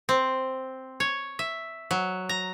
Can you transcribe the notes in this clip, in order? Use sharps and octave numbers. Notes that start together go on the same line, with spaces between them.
C4
C#5
E5
F#3
A#5